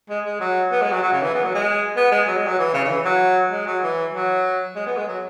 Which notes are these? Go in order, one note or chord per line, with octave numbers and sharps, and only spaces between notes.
G#3
G#3
F#3
B3
G#3
F#3
F#3
C#3
E3
B3
F#3
G#3
B3
G#3
F#3
G#3
F#3
E3
C#3
C#3
E3
F#3
G#3
F#3
E3
F#3
G#3
B3
G#3
F#3